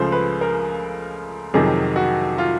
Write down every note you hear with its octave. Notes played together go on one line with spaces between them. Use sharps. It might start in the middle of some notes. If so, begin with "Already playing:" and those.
Already playing: C#2 C#3 F3 A3 C5
B4
A#4
F2 C3 D#3 F#3 G#4
F#4
F4